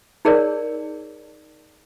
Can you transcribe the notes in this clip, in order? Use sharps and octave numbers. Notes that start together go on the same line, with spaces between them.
D#4 G#4 A#4 C#5 D5